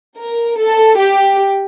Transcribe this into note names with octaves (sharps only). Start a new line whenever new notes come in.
A#4
A4
G4